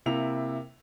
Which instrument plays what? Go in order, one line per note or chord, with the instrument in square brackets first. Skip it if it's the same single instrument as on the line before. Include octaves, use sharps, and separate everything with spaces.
[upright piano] C3 A#3 E4 F7